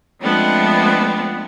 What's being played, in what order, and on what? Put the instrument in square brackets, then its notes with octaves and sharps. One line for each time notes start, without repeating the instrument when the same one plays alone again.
[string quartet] F3 G#3 A3 B3 C4 D4